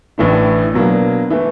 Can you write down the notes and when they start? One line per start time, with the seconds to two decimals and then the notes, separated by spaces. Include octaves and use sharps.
0.18 A1 A2 E3 A3 D4
0.74 B2 F#3 A#3 D4
1.30 E3 A3